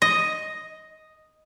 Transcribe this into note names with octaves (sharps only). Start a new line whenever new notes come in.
D#5